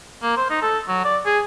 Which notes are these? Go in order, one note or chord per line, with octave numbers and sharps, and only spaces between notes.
A#3
C5
D#4
A4
F#3
D5
G#4